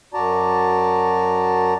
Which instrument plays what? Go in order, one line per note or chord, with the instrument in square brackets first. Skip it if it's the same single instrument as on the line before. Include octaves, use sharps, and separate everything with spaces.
[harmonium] F#2 F#4 D5 A5 A#5